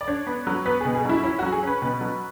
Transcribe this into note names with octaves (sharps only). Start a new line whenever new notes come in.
D5
D4 C#5
B3
F#3
B3 B4
B2 G#4
G#4
F#3 E4
C#4 E4
F#3 F#4
G#4
C#4 B4
B2 B4
F#3